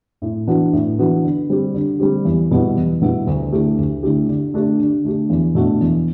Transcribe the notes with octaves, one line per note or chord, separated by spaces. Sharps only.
A2
E3 B3 D4 F#4
A2
E3 B3 D4 F#4
D3
G3 C4 G4
D3
G3 C4 G4
E2
B2 G3 B3 E4
E2
B2 G3 B3 E4
D2
D3 A3 E4 G4
D2
D3 A3 E4 G4
D3
A3 D4 G4
D3
A3 D4 G4
E2
B2 A3 D4 F#4
E2